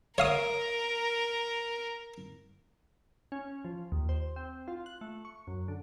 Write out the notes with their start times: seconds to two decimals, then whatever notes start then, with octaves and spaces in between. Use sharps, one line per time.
0.18 A#4 C#5 F5 D#6
3.32 C#4
3.65 F3
3.92 D#2
4.09 C5
4.36 C4
4.68 F4
4.86 F#6
5.01 A3
5.25 C#6
5.47 F#2
5.68 D3